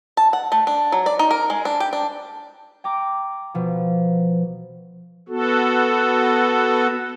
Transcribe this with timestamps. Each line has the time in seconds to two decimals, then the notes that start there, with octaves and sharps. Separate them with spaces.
0.17 A5
0.33 F#5
0.52 A3
0.67 D4
0.92 F#3
1.06 D5
1.19 D#4
1.31 A#4
1.50 G#3
1.65 D4
1.80 G4
1.93 D4
2.84 G5 A#5 D6
3.54 B2 F3
5.29 B3 F#4 A4